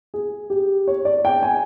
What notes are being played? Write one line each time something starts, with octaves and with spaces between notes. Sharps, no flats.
G#4
G4
C#5
D5
G5
G#5